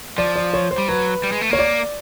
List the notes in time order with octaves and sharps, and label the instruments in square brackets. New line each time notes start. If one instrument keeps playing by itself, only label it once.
[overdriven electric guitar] F3 [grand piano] D5
[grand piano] D5
C#5
C5
[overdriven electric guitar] G3
[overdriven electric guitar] F#3 [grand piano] B4
[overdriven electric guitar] G3
G#3
A3
[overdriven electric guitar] A#3 [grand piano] C#5
[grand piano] D5